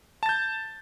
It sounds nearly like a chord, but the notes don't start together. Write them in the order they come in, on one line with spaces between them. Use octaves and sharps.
A5 A6 G6